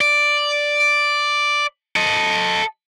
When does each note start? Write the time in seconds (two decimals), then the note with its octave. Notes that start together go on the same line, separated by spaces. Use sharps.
0.01 D5
1.96 A4 D#5